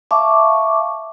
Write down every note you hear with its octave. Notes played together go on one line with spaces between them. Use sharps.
E5 F5 A5 C#6 D6